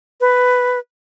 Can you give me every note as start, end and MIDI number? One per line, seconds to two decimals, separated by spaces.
0.21 0.79 71